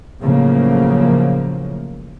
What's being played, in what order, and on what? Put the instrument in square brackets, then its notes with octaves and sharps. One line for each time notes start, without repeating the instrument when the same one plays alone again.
[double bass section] A2 C#3 F3 F#3 A#3